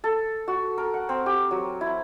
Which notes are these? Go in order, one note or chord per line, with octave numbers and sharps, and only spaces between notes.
A4
F#4
A#4
F#5
C4
G4
F#3
E4